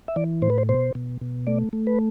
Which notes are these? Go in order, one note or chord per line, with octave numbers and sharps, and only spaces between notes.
E5
E3 D5
A2 C5
B4
C5
B2 C5
B2
B2
A3 D5
A3
B4